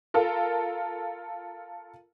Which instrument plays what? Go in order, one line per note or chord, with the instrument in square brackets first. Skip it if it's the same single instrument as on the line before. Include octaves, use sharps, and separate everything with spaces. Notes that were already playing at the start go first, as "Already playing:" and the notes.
[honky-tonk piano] F4 A4 A#4